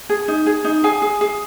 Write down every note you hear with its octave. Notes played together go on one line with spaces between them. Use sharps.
G#4
D#4
G#4
D#4
G#4 G#5
G#4
G#4